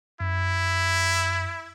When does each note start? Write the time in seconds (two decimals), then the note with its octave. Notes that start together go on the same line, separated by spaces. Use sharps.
0.20 F#2 E4